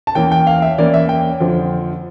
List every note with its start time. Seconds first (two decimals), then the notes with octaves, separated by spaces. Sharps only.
0.07 A5
0.15 E2 E3 A#3 C#4 G5
0.32 G5
0.47 F5
0.62 E5
0.78 E2 E3 A#3 C#4 D5
0.94 E5
1.09 G5
1.40 F2 D3 F3